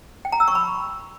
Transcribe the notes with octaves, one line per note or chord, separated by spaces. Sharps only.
G5
A#5
E6
C#6
B5